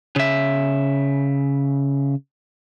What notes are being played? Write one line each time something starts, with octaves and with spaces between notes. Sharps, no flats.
C#3 E5